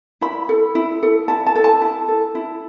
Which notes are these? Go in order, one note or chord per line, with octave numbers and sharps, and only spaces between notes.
E4 B5
A4
E4
A4
E4 A5
A5
A4
A5
E4
A4
E4